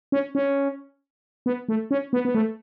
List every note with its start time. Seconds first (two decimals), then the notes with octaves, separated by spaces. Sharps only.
0.12 C#4
0.35 C#4
1.46 B3
1.69 A3
1.91 C#4
2.13 B3
2.25 B3
2.35 A3